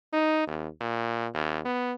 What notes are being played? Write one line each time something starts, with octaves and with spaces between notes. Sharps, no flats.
D#4
D#2
A#2
D#2
B3